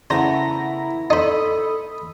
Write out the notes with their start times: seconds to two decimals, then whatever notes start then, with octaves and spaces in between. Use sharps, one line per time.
0.10 C#3 A3 B3 E4 C5 F#5 A#5 A#6
1.10 D#4 A4 C5 B5 D#6